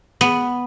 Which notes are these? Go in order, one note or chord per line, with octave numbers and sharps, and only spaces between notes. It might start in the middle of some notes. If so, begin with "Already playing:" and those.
B3